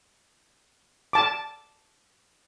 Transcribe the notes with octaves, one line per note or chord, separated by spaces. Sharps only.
A5 D6